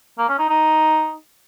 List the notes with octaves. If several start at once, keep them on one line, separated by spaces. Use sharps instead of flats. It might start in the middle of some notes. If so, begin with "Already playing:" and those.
A#3
C#4
D#4
D#4